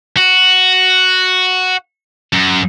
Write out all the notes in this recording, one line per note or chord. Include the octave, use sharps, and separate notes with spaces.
F#4
F#2